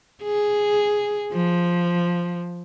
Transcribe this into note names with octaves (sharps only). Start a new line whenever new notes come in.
G#4
F3